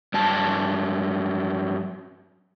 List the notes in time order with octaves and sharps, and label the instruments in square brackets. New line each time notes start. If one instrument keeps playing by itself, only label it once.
[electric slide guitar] G2 F#3 A5